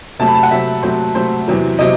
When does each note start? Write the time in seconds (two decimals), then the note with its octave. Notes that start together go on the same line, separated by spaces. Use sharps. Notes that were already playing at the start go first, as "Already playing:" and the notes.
0.19 C3 F#3 A3 A5
0.27 B5
0.35 A5
0.43 F#5
0.51 C3 F#3 A3 E5
0.82 C3 F#3 A3 C5
1.15 C3 F#3 A3 C5
1.48 E2 C3 F#3
1.79 C3 F#3 D#5